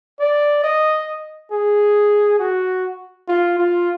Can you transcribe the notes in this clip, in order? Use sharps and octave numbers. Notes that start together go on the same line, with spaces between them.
D5
D#5
G#4
F#4
F4
F4